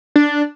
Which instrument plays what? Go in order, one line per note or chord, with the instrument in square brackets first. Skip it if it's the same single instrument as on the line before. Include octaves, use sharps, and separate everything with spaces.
[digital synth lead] D4